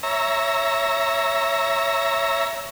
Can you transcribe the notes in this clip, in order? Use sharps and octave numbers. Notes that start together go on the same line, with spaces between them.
C#5 E5 A#5